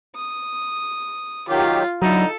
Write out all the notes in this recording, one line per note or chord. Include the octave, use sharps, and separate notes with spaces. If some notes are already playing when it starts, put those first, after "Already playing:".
D#6
D#3 F#3 F4 G4
D3 F#3 D#4 E4 A4